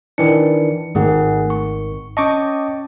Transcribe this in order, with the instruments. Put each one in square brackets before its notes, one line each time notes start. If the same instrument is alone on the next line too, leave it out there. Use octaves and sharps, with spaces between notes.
[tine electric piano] D#3 E3 D4 [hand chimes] C#7
[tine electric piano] G#1 D#3 [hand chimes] A3 G#4 F#5
[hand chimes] C#6
[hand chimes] C#4 A5 [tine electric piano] D#5 C#6 D6